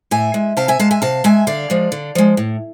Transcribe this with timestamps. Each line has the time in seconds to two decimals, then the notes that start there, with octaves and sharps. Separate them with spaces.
0.11 A2 E5 G#5
0.34 G#3
0.57 C3 F5 A5
0.68 E5 G#5
0.79 G#3 F5 A5
0.91 E5 G#5
1.02 C3 F5 A5
1.24 G#3 E5 G#5
1.47 D3 D5 F5
1.70 F3 G#3
1.92 D3
2.15 F3 G#3
2.37 A2